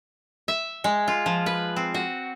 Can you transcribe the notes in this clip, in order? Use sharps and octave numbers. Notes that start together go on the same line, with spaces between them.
E5
G#3
F4
F3
B4
C4
F#4